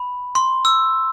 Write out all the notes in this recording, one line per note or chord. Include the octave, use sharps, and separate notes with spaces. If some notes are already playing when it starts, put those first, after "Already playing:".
Already playing: B5
C6
E6